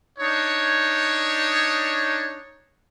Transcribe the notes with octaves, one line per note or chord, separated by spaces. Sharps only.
D4 D#4 C#5